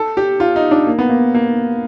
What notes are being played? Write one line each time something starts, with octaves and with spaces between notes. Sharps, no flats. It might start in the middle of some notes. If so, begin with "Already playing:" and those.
Already playing: A4
G4
F4
D#4
D4
A#3
B3
A#3
A#3